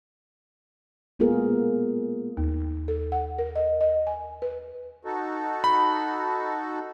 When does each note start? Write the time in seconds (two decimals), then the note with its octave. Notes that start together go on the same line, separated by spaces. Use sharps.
1.19 G#3 A#3 B3 F4 G#4 A#4
2.37 D#2
2.88 A4
3.12 F#5
3.39 A#4
3.56 D#5
3.81 D#5
4.07 G#5
4.42 B4
5.05 D#4 F#4 A4
5.64 B5